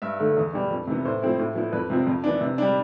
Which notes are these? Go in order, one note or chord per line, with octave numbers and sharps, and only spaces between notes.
G2 E5
D3 A3
E2
B2 G3 D4
F2
C3 E3 B3
A2 C5
F3 A3 C4 E4
A2
F3 B3 E4
F2 B4
C3 F3 C4
F2
E3 B3 D4
C3
G3 D4